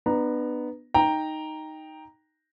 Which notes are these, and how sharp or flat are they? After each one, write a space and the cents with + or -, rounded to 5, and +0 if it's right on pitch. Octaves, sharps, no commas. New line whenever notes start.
B3 +0 D4 +35 A#5 +0
D#4 +0 G5 +5 A#5 +0